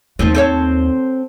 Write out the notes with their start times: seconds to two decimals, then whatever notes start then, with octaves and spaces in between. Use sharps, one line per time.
0.19 D#2 F3 A3 C4
0.35 C4 A4 C#5